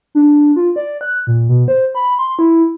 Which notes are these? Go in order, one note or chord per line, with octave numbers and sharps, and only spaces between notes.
D4
F4
D5
F#6
A#2
B2
C5
B5
C6
E4